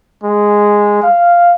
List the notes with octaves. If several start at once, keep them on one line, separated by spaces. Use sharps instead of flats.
G#3
F5